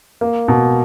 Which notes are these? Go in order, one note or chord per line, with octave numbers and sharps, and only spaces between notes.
A#3
B2